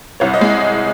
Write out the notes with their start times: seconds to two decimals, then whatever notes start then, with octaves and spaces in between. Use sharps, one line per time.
0.20 C2 C#5
0.34 D#5
0.41 G#3